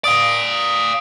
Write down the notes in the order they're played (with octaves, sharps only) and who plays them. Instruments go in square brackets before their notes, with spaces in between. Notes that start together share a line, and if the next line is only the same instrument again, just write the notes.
[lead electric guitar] D5 F5 [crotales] D#6 D7